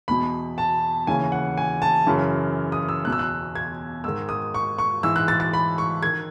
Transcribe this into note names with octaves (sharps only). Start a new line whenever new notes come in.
E2 B2 B5
A5
D#2 C#3 E3 G#5
F#5
G#5
A5
F#2 C#3 E3
D#6
E6
E2 B2 F#6
E6
F#6
G#6
G#2 D#3 E6
D#6
C#6
C#6
G#2 E3 E6
F#6
A6
A6
B5
C#6
D#3 G#6